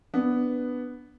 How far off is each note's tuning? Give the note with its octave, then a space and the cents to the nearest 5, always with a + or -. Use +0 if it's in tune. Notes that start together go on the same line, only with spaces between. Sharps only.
B3 +0 D4 +0 B4 +0